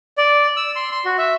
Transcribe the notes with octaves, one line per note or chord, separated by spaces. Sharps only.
D5
E6
C6
C6
F#4
E5